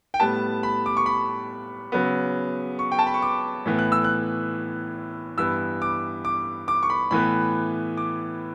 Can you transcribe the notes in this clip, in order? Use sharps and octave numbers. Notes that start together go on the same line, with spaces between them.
G5
A2 G3 B3 A5
B5
D6
C#6
B5
C#3 F#3 B3
C#6
G5
A5
B5
C#6
D6
A2 E3 B3
F#6
E6
F#6
G2 E3 B3 E6
D6
D6
D6
C#6
B5
A2 E3 B3 B5
D6